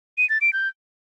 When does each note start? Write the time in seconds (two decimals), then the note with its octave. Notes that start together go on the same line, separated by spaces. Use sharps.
0.18 D#7
0.30 A6
0.41 D7
0.53 G6